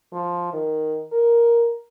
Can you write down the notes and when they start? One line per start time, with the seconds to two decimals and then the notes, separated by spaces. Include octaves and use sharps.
0.13 F3
0.53 D#3
1.13 A#4